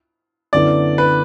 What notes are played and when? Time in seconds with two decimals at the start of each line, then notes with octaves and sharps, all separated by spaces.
0.53 F#2 D3 B3 E4 D5
0.98 B4